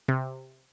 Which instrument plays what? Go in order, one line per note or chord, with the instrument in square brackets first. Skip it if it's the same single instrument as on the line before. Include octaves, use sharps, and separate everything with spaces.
[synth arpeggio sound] C3